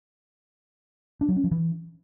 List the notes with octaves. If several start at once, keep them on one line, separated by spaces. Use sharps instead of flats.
D4
F#3
C#4
F3
E3